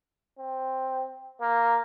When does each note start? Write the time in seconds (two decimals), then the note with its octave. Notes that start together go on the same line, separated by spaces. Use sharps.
0.39 C4
1.41 A#3